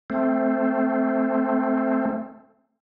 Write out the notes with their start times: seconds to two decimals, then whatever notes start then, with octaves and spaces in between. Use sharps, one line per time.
0.10 A3 C4